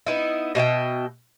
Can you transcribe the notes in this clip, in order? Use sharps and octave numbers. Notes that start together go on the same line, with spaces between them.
B3 D#4 E4
B2 D#5 E5 G5